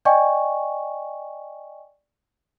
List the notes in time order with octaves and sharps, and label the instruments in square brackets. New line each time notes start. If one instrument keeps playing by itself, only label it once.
[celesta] D5 D#5 G5 G#5 C#6